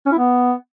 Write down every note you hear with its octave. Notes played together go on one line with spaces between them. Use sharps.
C#4
E4
B3